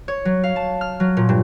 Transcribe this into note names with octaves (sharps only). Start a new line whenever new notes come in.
C#5
F#3
F5
A5
F6
F#3
A#2
G2